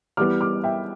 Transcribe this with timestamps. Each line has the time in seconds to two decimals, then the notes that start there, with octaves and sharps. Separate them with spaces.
0.17 E3 G3 B3 D6 F6
0.41 D6 F6
0.64 E5 G5